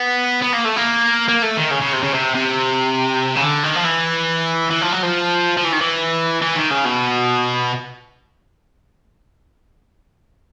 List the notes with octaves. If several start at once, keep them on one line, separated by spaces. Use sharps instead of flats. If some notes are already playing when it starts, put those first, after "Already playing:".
Already playing: B3
B3
A#3
A3
A#3
A#3
A3
D#3
C#3
C#3
C3
C#3
C3
C3
C#3
D3
D#3
F3
E3
E3
F3
F#3
F3
F3
E3
D#3
E3
E3
D#3
C#3
B2